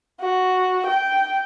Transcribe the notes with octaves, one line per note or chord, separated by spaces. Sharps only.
F#4
G5